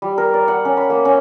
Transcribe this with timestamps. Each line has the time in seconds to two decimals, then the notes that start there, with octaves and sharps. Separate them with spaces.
0.02 G3
0.18 A#4
0.34 D5
0.48 F#5
0.65 C#4
0.77 B5
0.90 A#3
1.05 C#4